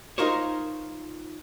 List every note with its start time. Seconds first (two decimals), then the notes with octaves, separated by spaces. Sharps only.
0.18 D#4 F4 A#4 C5 C#5